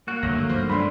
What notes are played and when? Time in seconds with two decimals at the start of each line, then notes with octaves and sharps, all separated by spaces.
0.08 A#3 F#4 F#6
0.23 G1 D2 G#2 F#3 A3 A#6
0.49 G2 D#3 F3 C5
0.70 G#3 D4 B5 C6